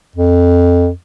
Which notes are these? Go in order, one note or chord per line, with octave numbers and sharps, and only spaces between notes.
F2